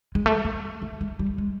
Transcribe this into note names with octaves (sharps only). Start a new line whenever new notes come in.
G#3
A3
A3
A3
G#3
G3
G#3